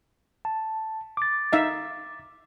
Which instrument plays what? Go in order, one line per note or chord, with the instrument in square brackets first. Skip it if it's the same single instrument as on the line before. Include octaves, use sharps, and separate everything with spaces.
[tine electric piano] A5
D6 A6
[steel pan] D#4 E5 F5